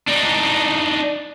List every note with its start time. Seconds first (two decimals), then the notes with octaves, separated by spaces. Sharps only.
0.08 D4 D#4